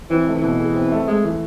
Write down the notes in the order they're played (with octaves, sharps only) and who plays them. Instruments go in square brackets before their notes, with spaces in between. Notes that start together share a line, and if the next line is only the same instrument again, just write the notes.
[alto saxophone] E3 [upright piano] C4
[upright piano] A3
[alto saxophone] E3
[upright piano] B2
G#4
C4
A3
[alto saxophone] G#3 [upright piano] A3
[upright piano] E3